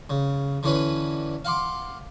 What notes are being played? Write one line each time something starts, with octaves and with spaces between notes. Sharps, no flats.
C#3
D3 E3 C#4 B4
F5 F#5 C6 D6